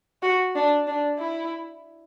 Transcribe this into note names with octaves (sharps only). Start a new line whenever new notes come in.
F#4
D4
D4
E4